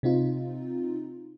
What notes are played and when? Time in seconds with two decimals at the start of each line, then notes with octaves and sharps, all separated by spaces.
0.03 C3 C4 D#4 F4